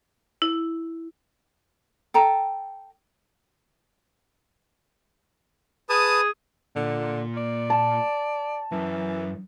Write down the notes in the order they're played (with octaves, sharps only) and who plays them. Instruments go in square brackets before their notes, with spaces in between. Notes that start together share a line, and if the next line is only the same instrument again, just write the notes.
[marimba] E4
[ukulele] A4 G5 A#5
[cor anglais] G#4 [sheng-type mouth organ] B4 A5 D#6
[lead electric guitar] A#2 F4 [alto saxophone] D3
[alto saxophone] D5
[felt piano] A5
[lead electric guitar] F#2 [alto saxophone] E3